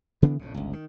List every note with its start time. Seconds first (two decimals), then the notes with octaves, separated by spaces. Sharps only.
0.22 C#3 E3 B3 D4
0.39 A#1 F2 C#3
0.54 G1 C#2
0.73 D#3